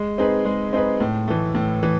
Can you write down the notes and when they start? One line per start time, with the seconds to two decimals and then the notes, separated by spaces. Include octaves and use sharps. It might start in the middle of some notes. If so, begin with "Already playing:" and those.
Already playing: G#3
0.18 C4 D#4 G#4 B4
0.45 G#3
0.73 C4 D#4 G#4 B4
1.00 A2
1.28 E3 A3
1.55 A2
1.83 E3